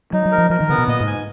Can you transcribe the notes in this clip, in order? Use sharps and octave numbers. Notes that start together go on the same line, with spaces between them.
F#3 D#4
F#3
A#4
F3
F3 A#4
D#3
C#3 B3
B2
A#2 D#5
G#2
G#5